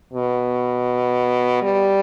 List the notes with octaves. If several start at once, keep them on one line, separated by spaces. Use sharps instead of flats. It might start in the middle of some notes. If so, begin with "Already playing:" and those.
B2
G3